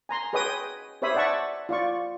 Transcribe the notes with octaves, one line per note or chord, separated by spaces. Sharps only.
G#5 A#5 C6
G#4 B4 C#5 D#5 G5 D#6
G4 C5 C#5 E5 B5 D#6
D5 E5 F#5 A5 C#6
F4 D5 C#6